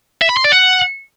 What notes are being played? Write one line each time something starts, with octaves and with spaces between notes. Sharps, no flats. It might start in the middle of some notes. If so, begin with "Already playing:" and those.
E5
B5
C6
D5
F#5